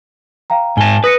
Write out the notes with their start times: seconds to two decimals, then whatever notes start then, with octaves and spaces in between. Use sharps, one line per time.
0.50 F5 G5 A#5
0.77 G#2 G#5 A5 G7
1.04 B4 D#6 A#6 C#7